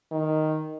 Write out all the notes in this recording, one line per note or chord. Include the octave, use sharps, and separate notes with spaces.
D#3